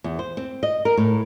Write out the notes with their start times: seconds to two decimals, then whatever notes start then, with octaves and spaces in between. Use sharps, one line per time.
0.04 E2
0.19 C5
0.37 C4
0.63 D#5
0.85 A#4
0.97 A2